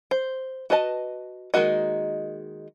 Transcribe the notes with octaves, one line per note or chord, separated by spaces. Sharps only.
C5
F#4 B4 D#5 A5
D#3 G#3 A#3 F#4 D#5